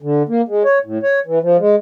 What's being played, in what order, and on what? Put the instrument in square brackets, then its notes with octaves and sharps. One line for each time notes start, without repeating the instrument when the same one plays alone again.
[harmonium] D3
A#3
G#3
C#5
A2
C#5
E3
F3
G#3